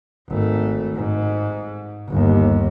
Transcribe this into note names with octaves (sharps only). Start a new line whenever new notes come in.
G#1 A3
G#2
G1 D#2